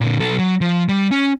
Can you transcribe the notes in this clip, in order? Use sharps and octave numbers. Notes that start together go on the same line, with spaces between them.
A#2 D3
B1 A4
F#3
F3
G3
C#4